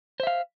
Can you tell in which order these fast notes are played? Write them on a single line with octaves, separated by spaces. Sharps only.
C5 E5 F5